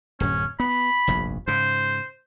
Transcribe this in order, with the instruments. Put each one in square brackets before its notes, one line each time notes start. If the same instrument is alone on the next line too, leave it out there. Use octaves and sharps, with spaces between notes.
[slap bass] D1 F#2 [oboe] C#4
[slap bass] B3 [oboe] B5
[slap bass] F1 A#1 G2
[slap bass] G#2 C#3 [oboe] C5